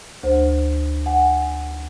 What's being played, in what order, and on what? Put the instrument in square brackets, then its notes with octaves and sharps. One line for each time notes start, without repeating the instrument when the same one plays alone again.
[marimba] D2 C5
F#5 G#5